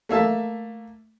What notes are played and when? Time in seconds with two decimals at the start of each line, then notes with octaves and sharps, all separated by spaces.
0.09 A3 A#3 E5 A5